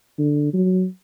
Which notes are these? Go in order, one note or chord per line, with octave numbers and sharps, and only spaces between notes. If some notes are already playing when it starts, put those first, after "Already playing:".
D3
F#3